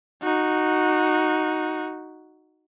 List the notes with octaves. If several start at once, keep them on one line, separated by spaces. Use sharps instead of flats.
D#4 F#4